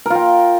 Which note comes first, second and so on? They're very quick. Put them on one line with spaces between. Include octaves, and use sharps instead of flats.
A#4 F4 G5